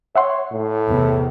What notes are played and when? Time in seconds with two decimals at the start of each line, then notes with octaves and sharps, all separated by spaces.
0.15 C#5 E5 F#5 C6
0.51 A2
0.88 E2 C3